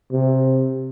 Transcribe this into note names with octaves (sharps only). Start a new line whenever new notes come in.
C3